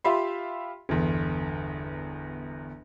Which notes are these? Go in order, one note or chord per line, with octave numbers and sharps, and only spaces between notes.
F4 G4 E5 F5 B5 C6
G1 E2